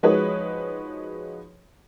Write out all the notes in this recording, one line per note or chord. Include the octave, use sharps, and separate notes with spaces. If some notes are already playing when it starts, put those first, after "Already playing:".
F3 G#3 D#4 F#4 B4 C#5